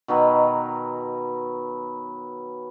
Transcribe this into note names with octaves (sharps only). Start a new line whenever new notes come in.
B2 D#3 F#3 B3